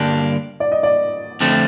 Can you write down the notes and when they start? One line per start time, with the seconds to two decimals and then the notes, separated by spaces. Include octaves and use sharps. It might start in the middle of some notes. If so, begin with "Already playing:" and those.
Already playing: G2 D3 G3 A#3 D4
0.60 D5
0.72 D#5
0.83 D5
1.40 F2 D3 F3 A3 C4